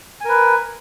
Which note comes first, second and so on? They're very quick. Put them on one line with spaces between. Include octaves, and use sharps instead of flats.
G#5 A#4 B4